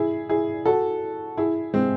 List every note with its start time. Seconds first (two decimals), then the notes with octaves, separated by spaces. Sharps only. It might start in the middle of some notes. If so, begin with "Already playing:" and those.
Already playing: E4 G#4
0.29 E4 G#4
0.66 F#4 A4
1.37 E4 G#4
1.74 G#3 C4